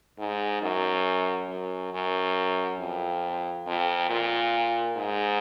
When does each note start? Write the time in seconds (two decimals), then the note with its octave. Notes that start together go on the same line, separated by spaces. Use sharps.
0.19 G#2
0.62 F#2
1.49 F#2
1.93 F#2
2.80 F2
3.67 F2
4.10 A#2
4.96 G#2